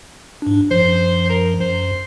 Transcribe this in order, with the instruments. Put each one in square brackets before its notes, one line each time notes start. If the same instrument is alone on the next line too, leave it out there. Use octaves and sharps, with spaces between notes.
[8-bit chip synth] G#2 D4
[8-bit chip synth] F#2 F3 [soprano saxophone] C5
[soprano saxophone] A#4
[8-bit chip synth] F#2 [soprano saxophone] C5